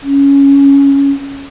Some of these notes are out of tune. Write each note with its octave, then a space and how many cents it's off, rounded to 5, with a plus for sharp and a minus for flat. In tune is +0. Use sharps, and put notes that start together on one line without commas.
C#4 +5